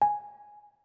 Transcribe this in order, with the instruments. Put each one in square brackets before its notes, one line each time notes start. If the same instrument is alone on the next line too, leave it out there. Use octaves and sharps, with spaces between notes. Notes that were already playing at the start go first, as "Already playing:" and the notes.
[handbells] G#5